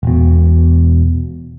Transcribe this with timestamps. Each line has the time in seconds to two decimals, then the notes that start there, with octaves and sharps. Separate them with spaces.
0.03 E1 B2